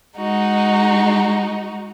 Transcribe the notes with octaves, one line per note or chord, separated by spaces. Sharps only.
G#3 D#4 F#4